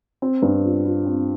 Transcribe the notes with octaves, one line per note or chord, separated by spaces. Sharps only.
C4
G2
F4
F4
C4